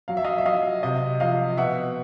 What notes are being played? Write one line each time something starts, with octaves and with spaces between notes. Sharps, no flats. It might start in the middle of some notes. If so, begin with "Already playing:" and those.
F#3 F5
E5
D#5 F5
E5
F#3 D#5 F5
C3 D#5
F3 D#5 F5
B2 E5 F#5